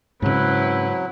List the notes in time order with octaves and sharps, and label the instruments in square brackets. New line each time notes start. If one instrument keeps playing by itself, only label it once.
[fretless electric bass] G#2 C#3 [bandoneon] F#3 [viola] C4 E4 [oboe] B4